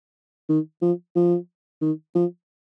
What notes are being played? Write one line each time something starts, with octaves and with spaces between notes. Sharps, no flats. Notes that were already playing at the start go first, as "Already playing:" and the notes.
D#3
F3
F3
D#3
F3